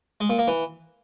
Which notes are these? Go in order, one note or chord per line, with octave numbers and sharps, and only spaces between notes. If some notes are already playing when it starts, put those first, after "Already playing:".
G#3
A#2
A#3
E3